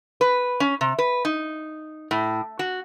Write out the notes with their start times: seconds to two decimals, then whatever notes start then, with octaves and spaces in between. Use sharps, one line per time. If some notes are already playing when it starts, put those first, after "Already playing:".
0.21 B4
0.60 C#4
0.81 C3
0.99 B4
1.25 D#4
2.11 A2
2.59 F#4